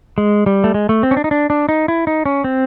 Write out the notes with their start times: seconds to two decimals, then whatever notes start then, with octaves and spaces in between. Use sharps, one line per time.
0.18 G#3
0.46 G3
0.64 A3
0.74 G#3
0.89 A3
1.03 C4
1.11 C#4
1.17 D4
1.24 D#4
1.31 D4
1.50 D4
1.69 D#4
1.88 E4
2.07 D#4
2.26 C#4
2.44 C4